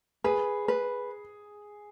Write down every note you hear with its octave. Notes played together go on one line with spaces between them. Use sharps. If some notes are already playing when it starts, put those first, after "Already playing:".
G#4 B4
B4